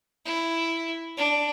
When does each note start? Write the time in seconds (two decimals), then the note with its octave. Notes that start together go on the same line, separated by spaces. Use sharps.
0.25 E4
1.17 D4